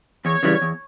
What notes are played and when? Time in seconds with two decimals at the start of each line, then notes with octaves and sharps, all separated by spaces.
0.25 E2 C#5
0.43 C#3 E3 G3
0.62 E2